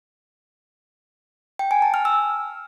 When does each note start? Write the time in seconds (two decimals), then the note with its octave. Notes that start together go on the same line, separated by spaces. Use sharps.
1.59 G5
1.71 G#5
1.82 A5
1.94 F6
2.05 E6